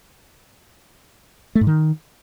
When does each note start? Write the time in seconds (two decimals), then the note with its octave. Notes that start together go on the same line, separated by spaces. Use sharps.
1.55 A3
1.61 G#2
1.67 D#3